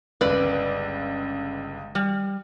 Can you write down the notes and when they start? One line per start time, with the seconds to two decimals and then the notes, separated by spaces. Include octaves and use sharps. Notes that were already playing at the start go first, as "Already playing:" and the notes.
0.21 G1 C#2 B4 D5
1.95 G3